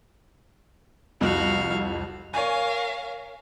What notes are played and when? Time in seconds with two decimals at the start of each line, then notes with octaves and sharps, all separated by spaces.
1.21 C2 F2 F#4 F5
2.34 A#4 C#5 F5 G#5